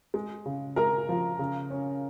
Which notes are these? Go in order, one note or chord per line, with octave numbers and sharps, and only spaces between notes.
G#3
C#3
G#3 A#4 A#5
F3
C#3
C#4